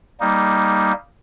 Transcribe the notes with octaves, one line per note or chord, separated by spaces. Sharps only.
G3 A#3 D#4